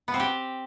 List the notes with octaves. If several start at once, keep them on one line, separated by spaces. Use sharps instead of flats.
B3
C4
G4